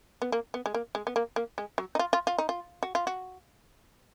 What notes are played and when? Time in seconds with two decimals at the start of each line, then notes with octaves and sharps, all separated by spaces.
0.22 B3
0.32 A#3
0.54 B3
0.66 G#3
0.74 A#3
0.95 G#3
1.07 B3
1.16 A#3
1.36 A#3
1.58 G#3
1.78 F#3
1.95 D#4
1.99 F4
2.13 F4
2.27 F4
2.38 D#4
2.49 F4
2.83 F#4
2.95 F4
3.07 F#4